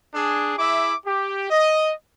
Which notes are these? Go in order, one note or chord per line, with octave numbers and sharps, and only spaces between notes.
D4 G#4
E4 G#4 E5 D6
G4
D#5